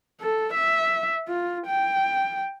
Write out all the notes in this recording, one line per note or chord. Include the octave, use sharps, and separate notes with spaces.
A4
E5
F4
G5